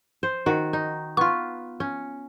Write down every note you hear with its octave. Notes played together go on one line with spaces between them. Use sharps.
C5
D#3 F#4
D#4
B3 F4 C#6 F6
C#4